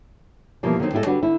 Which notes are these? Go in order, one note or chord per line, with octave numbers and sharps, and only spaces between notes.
B2 E3 F3 G3 A#3
D3 D#3 F#3 G3 C4 D#4
A2 G#3 E4 G4 A4 D#5
D3 G3 D4 F#4 B4
D3 E4